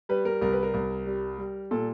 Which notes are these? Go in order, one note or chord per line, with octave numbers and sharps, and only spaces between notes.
G3 B4
A#4
C2 A#4
B4
A#4
C2
G3
G3
A#2 A4